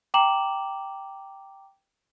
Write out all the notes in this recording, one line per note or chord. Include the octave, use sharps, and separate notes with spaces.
G5 A#5 D6 E7 F#7